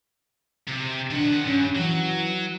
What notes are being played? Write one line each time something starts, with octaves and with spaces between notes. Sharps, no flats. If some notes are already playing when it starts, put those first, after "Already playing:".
C3
D#3 D4 F#5
G2 C#4
E3 F#3